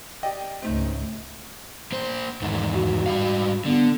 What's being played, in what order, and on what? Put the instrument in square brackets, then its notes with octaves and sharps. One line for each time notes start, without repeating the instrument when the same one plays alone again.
[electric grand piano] G4 D5 D#5 [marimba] G5
[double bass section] C#2 G#2 [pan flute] A3 [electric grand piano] C4 D#4
[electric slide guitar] A#3 C5
E2 G#2 D#3
[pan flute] F#4
[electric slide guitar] G#2 G3 F5
[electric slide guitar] D3 [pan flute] B3